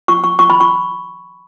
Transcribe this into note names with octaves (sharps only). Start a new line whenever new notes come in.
C#6
C#6
C#6
B5
C#6